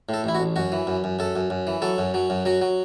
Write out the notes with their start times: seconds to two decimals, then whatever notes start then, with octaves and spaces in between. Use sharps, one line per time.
0.09 A2 A4
0.24 A1 E4
0.35 F#4
0.40 A1
0.56 F#2 F#4
0.72 E3
0.87 F#2
1.04 F#2
1.19 F#2 A4
1.36 F#2
1.50 F#2
1.67 E3
1.82 F#3 A4
1.98 F#2
2.14 F#3
2.30 F#2
2.45 F#3 F#4
2.61 F#3